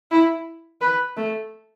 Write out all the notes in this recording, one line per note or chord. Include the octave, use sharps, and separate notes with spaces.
E4
B4
A3